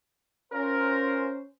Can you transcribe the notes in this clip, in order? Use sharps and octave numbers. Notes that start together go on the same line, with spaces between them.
C#4 F4 A#4 C5